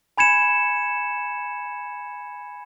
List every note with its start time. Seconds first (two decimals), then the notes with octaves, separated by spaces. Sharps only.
0.18 G#5 B5 G#6 C#7 E7